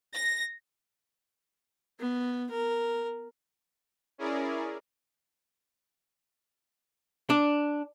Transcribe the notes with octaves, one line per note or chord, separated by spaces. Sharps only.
A#6
B3
A#4
C#4 E4 G#4 A#4 D5
D4